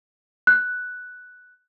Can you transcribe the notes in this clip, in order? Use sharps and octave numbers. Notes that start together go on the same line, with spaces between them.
F#6